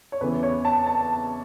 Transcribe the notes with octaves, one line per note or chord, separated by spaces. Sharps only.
C#5
E2 C#3 E3 B4
C#5
A5
A5